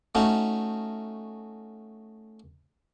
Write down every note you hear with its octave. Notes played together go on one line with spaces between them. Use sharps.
A3 C#4 D#4 F#4